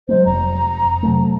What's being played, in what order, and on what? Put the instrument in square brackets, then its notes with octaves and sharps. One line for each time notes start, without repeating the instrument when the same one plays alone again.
[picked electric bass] F#3 G#3 A#3 [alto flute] C5
[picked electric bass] F1 [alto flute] A#5
[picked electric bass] C3 F#3 A3